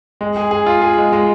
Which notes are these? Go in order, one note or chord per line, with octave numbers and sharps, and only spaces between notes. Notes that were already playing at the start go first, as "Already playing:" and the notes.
G#3
G#4
G#4
F4
G#4
G#3
G#3